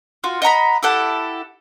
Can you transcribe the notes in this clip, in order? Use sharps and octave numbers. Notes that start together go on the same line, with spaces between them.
F4 F#4
D#5 F#5 A#5 B5
E4 G4 A4 F#5